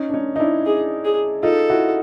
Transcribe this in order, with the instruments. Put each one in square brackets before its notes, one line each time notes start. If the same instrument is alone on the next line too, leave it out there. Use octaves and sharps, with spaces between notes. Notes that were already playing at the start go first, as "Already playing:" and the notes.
Already playing: [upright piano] C#4 D#4
D4
C#4 D#4
D#4
D4 E4
[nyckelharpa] G#4
G#4
[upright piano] D#4 F4 [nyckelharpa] A4
[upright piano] E4 F#4